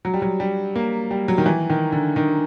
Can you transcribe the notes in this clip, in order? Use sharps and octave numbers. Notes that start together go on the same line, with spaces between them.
F#3
G3
F#3
G3
A#3
G3
F#3
D#3
E3
D#3
D3
D#3